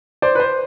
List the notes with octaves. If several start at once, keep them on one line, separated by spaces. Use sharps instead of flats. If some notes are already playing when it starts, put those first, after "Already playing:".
C5 D5
B4
C5